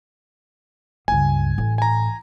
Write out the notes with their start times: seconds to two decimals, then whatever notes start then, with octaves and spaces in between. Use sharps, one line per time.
1.08 C#2 G2 G#5
1.58 A1
1.78 G#5 A#5